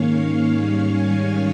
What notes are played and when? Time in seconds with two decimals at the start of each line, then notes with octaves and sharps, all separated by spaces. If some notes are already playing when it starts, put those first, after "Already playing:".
Already playing: G#2 D#3 A#3 C#4 C#5 F5
0.52 G#2 D#3 G3 C#4
0.91 F5 G#5